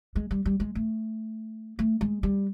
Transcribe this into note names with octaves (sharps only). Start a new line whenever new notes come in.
G#3
G3
G3
G#3
A3
A3
G#3
G3